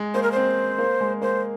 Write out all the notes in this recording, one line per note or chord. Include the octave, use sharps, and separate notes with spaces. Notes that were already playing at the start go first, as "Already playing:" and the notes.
Already playing: G#3
A#3 C5
A#4
C4 C5
A#3
G#3
A#3 C5